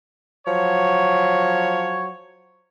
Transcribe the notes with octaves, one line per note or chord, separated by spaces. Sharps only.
F3 F#3 C#5